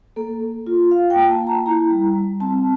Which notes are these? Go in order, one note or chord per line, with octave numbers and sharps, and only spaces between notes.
A#3 A4
A#3
F4
F4 F5
G5
A#3
A5
A#3
A#5
E4 A#5
G3
G3
C4 A5